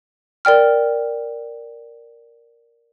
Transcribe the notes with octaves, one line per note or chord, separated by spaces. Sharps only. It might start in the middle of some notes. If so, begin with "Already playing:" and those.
A#4 D5 G5 F6